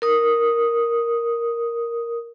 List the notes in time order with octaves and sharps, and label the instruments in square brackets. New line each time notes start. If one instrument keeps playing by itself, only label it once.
[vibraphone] A#4 D#6